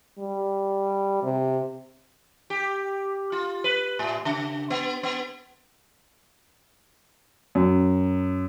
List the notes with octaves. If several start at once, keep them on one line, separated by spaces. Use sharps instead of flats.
G3
C3
G4
F4
B4
A2
C#3
B3
B3
F#2